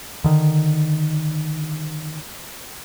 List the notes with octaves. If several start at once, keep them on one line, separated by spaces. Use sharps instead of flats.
D3 D#3